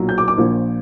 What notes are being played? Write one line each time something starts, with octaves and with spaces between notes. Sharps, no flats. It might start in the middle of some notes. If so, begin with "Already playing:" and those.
Already playing: B1 A#2 F#3
G6
D6
D6
A#1 A#2 F3